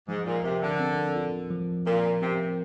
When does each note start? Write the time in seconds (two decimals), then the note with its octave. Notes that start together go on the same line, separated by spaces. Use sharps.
0.09 G#2 F3
0.26 A#2
0.44 C3 A#4
0.62 D3
0.80 C4
1.16 F4
1.51 F3
1.86 A#2 A#4
2.22 C3 C4